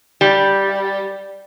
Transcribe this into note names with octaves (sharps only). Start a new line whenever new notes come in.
G3